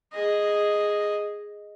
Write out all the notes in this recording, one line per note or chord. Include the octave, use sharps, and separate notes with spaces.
G#4 D#5